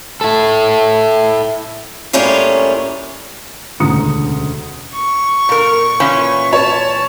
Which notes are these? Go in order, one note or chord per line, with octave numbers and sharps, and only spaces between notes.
E4 A4
A2 G3 A#3 C#4 F4
E1 D2 C#3 A#5 D#6 C#7
C#6
A#2 A#4
A#2 E3 C#4
C#5 A5